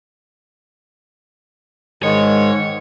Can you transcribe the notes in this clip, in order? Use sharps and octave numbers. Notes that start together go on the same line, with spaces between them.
G#2 D#3 G#3 C#5